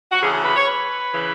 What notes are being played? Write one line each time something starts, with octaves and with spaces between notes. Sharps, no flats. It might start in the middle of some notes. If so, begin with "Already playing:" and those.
F#4
D2 C#3 E3 G#4
G#4
B4
C#5
B4
C#3 E3